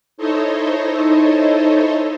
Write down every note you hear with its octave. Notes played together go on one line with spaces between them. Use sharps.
D#4 E4 A4 C5 C#5 D#5